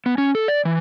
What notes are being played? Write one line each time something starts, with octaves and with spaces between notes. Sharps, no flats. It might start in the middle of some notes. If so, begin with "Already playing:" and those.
B3
C#4
A4
D5
E3